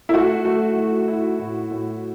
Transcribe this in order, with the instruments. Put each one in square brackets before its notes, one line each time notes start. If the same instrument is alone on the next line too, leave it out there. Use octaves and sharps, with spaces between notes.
[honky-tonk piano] E4
[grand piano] A3 [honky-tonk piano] F#4
[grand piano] A3
A3
E4
A2
A2